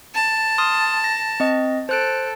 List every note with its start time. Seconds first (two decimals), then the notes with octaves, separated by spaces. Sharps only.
0.15 A5
0.58 C6 D#6 F6
1.04 A#6
1.40 C4 D#5
1.89 A4 C5 F#6 D7